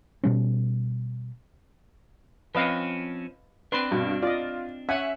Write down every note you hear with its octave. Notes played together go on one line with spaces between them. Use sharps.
B2 G3 C#4
F3 C4 C#4 B4 D#5 F5
C4 D4 B4 C6
G2 B2
F4 D5 D#5
C#4 E5 F#5 G#5